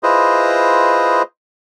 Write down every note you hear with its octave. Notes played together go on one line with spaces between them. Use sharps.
E4 F4 G#4 B4 C5 D#5